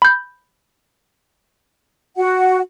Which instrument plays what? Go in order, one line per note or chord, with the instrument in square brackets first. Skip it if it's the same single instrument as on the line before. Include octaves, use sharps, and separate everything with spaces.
[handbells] B5 G6
[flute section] F#4 F#5